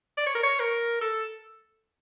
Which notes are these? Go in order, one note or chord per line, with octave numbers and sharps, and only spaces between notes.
D5
C#5
A#4
C#5
A#4
A4